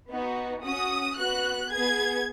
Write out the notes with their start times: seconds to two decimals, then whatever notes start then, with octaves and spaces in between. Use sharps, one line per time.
0.10 B3 D#4 F#4
0.64 C#4 F#4 D#6
1.17 B3 F#4 F#6
1.71 B3 G#4 G#6